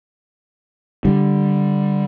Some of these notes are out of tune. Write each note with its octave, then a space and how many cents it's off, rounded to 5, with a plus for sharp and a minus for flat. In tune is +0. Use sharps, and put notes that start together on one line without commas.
D3 +0 G3 +0